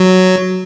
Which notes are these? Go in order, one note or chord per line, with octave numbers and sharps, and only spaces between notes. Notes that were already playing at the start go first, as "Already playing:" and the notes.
Already playing: F#3